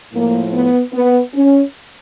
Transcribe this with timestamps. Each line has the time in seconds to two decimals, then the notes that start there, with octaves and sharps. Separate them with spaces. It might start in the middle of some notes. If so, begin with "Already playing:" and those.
0.13 A2 F3 A#3
0.53 B3
0.93 B3
1.33 C#4